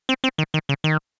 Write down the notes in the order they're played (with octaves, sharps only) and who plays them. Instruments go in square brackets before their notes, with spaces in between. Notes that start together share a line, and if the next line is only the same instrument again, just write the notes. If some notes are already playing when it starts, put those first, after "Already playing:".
[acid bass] C4
C4
D#3
D#3
C#3
D#3